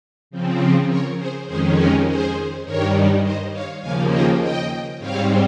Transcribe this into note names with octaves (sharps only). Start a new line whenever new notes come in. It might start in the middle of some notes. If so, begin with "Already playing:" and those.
C#3 F3 C4
A#4 C#5
G#4 C5
F2 D#3 G#3 C#4 G#4 C5
G4 A#4
G#4 C5
G2 D#3 G3 A#4 C#5
C5 D#5
C#5 F5
D#2 C#3 F3 A#3 F5 G#5
D#5 G5
D#5 G5
G#2 G3 C4 C#5 F5